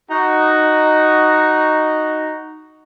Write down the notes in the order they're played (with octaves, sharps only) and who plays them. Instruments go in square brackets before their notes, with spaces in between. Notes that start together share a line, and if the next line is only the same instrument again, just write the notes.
[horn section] D#4 F#4